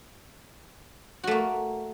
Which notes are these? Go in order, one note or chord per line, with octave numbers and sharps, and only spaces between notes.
A3 A#3 F#4